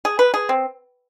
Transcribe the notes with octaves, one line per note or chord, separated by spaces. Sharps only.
G#4
B4
G#4
C4